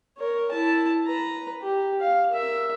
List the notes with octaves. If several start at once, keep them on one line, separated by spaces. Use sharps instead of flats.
A#4 C#5
E4 A5
B4 A#5
G4
F5
A#4 E5